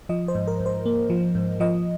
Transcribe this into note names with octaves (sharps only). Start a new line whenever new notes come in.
F3 D#5
C5
G#2
A#4
G#2
C5
A#3
F3
G#2
F3 D#5